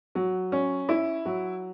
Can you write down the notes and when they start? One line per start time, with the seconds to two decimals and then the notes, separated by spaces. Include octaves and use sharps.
0.15 F#3
0.52 C#4
0.89 E4
1.25 F#3